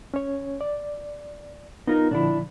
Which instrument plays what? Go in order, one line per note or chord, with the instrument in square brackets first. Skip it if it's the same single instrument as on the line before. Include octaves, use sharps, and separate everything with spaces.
[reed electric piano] C#4 C#5
D5
[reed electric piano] B3 F4 [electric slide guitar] D#4 A#4
[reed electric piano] A#2 D3 F3 [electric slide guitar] D4 E4